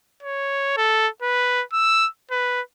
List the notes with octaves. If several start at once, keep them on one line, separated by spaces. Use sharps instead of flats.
C#5
A4
B4
E6
B4